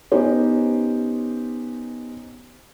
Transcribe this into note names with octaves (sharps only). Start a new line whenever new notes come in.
B3 C#4 D#4 G4 C5